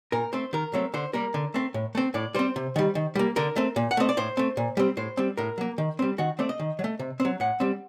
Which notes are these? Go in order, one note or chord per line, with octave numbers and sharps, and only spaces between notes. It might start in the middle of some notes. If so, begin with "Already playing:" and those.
A#2 A#4
A3 C4 C5
D#3 A#4
F#3 A3 C4
D3 C5
G3 A#3 A#4
D3
A3 C4
A2
A3 C4
A2 D5
G3 C4 C5
C3
D#3 G3
D#3
G3 A#3
D3 A#4
A3 C4
A#2
F#5
A3 C4 D#5
D5
A2 C5
A3 C4
A#2
G3 C4
A2 C5
G3 C4
A2 A#4
F#3 A#3
D#3
G3 C4
D#3 F#4
A3 C4 D5
D#5
D#3
F#3
A3
C3
C4
F#3
A2 F#5
G3 C4